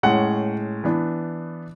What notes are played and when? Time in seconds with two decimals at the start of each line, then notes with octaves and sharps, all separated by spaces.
0.03 A2 G#3 C#4 F#5
0.84 E3 B3 D4